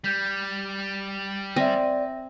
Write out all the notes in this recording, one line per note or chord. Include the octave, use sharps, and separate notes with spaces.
G3 G6 B6
C4 D5 E5 G#5 A#6